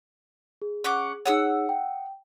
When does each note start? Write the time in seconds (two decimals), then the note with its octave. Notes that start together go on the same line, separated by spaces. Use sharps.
0.62 G#4
0.84 C#4 F#5 D6
1.26 D#4 G#4 C#5 F#5 D#6 E6
1.69 G5